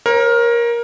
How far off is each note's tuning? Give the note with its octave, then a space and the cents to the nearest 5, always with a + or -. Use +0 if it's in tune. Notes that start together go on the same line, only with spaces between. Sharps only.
A#4 +15 C#5 -40